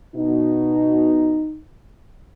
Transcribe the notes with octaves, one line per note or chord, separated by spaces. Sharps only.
B2 D#4